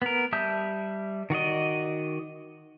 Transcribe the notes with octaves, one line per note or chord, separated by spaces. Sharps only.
B3 A#4
G3 E5 A5 D#6 G6
D#3 F#4 D5 D#5